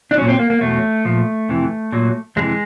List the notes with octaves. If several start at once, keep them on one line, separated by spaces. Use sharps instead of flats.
D4
A#2 F#3 C#4
C4
A#3
A#3
E2 B2 F#3 A3
A#2 F3
F2 C3 E3
A#2 F#3
F2 C3 E3 G#3